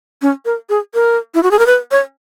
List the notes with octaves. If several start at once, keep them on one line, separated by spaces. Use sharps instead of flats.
C#4
A#4
G#4
A#4
E4
F#4
G#4
A#4
B4
C#5